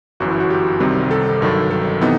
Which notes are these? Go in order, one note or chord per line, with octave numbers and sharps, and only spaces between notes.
G1 F#2 E3 F#4
E4
F#4
G4
C2 C3 D#3 G3 C4
A4
G1 G2 D#3 F#3
A4
C3 E3 B3 D#4